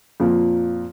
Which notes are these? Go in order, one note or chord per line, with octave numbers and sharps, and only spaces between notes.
F2 A#2